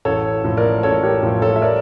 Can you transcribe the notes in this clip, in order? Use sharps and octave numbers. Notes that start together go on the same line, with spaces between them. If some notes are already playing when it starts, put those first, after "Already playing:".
A1 A4 C#5
A2 F3
A#4 D5
A1 A4 C#5
G4 A#4
A2 F3
A4 C#5
E5
A#4 D5